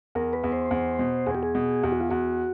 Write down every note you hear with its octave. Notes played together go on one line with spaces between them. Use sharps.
E2 A#4
B4
E2
C5
E2
B2
E2 G#4
G4
G#4
B2
E2 G4
F#4
F4
E2 F#4